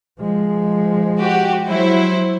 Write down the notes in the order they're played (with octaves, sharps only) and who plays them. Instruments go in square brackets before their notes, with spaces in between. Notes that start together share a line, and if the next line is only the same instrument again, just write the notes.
[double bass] F3 G#3
[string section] F#4 G4
F#3 E4 C5